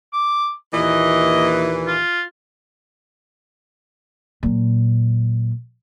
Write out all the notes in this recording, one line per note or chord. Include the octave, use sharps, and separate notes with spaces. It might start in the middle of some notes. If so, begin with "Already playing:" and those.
D6
D#2 A#2 E3 D#5
F4
A#2 F#3